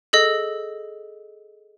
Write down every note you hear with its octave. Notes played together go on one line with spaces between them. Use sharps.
G#4 A4 D#5